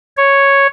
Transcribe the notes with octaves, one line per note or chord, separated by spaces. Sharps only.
C#5